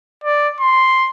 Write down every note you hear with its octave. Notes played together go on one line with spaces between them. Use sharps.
D5
C6